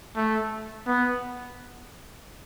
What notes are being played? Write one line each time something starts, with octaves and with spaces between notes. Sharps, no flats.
A3
B3